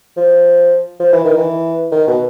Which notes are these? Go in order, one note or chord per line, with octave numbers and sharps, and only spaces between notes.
F3
F3
E3
D#3
E3
D#3
B2